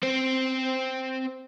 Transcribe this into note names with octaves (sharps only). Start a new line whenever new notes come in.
C4 C5